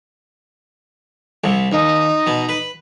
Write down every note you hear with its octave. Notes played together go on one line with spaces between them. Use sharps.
C2 C3
D#2 D#4
B2
B4